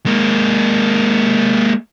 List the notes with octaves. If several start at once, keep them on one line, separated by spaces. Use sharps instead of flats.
G#3 A#3